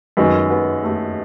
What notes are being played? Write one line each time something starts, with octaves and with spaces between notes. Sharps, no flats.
F#2 D#3 G#3 B3
B3
A3